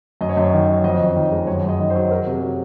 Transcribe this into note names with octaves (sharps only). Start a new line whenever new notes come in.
F#2 D#5
C#5
F#2 D#5
D#3
F#3
F2 D#5
F2
D#3
G#3
F#2 C#5
F#2
D#5
D#3
C5
F#3
F#3 A#4
C3
G#4
F#3